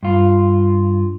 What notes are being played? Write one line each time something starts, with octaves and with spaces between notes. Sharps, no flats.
G2 F4